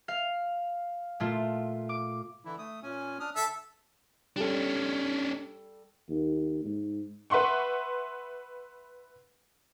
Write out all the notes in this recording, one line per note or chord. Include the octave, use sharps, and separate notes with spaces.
F5
A#2 A3 F4
D6
D3 E3 E4
A3 D#6
A#2 C#4 G#5
D4 D#6 F6
D3 A4 E5
G3 C#4 D4 A4
D#2
G#2
B4 E5 F#5 C6 C#6